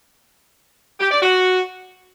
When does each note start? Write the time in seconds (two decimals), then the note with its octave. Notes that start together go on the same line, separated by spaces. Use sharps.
1.00 G4
1.11 D5
1.22 F#4